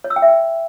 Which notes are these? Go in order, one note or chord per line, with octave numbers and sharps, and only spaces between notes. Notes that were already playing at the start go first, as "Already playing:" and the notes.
C#5
E6
G5
E5
G5